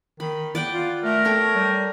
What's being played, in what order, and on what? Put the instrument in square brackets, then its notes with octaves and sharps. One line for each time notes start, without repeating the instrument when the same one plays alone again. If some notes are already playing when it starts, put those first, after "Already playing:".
[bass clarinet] D#3 [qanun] B5
[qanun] D5 F#5 G5
[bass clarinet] F4
[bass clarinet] A3 [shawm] A#4
[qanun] A4 C#5 G5
[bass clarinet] G3